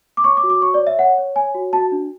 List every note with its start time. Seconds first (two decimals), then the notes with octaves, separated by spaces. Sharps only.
0.17 D6
0.24 C#5 C#6
0.37 D6
0.43 F#4
0.50 D6
0.62 C#5 C#6
0.74 D5
0.80 C#5
0.87 E5
0.99 C#5 F#5
1.18 C#5
1.36 C#5 G#5
1.54 F#4
1.73 F#4 A5
1.92 D4